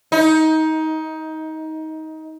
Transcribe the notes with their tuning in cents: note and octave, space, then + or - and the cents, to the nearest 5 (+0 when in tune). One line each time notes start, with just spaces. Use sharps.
D#4 +20